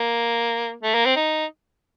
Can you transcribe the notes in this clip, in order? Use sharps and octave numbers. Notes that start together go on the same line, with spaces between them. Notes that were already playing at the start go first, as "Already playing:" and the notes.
Already playing: A#3
A3
A#3
C4
D#4